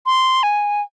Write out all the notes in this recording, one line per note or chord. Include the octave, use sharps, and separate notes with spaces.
C6
G#5